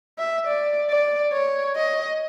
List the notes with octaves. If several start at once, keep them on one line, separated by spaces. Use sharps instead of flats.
E5
D5
D5
C#5
D#5